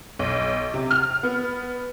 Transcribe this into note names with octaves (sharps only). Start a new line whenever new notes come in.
B1
C3
F6
B3